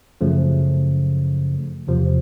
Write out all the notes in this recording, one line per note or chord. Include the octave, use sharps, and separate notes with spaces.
F#2 C#3 F3 A3
E2 C3 F3